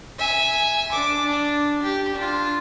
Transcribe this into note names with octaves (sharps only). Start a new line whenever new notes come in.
E5 G#5
D4 D6
D4
G4
D4 F4